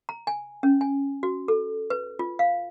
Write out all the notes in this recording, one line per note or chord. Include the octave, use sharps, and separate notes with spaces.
A#5
G#5
C#4
G#5
F#4
A4
B4
F4
F5